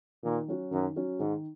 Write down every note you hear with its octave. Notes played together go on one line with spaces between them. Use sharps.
A#2 D#3
F#3 C#4 F#4
F#2 D#3
F#3 C#4 F#4
G#2 D#3